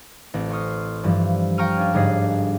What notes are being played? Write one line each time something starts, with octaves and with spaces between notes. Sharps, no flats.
A1 C4
C6 C#6 D#6 F6
G2 E3 F3 G3
F5 G5 A#5 C#6 F6 D#7
C#4 D4
G1 G#2 G3 G#3 G#4 C7